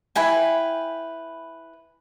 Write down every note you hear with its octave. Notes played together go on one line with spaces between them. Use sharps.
E4 B4 G5 G#5